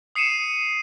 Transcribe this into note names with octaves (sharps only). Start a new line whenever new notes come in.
D#6 C7 C#7 D#7 E7